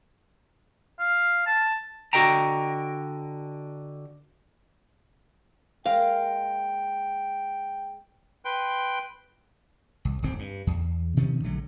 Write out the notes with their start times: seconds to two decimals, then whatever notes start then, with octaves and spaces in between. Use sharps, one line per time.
0.99 F5
1.46 A5
2.13 D3 F#4 A4 D#5 G5 A#5
5.86 G#3 A#3 F5 G5
8.45 B4 G5 C6
10.05 C2
10.22 D1 G1 G#2 C4
10.39 G2
10.67 E2
11.17 B2 D#3 F3 C#4
11.44 A#1 D3 F#3 A3